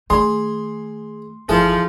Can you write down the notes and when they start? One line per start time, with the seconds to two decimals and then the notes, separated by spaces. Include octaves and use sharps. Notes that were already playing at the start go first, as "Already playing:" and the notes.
0.10 D#3 A3 G#4 C6
1.49 G1 E2 F3 E4 G#4 A4